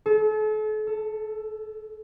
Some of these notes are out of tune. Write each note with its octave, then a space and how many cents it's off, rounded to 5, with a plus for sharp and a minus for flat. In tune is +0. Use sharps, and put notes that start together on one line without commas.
A4 -40
A4 +10